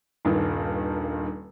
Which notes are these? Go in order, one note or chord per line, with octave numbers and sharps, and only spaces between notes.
D#1 G2 D#3